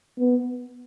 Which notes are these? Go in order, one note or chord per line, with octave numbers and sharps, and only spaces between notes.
B3